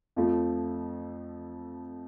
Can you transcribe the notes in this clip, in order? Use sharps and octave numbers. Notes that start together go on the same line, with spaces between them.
F2 F3 A3